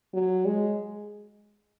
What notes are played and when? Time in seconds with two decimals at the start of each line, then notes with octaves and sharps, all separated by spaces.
0.13 F#3
0.45 G#3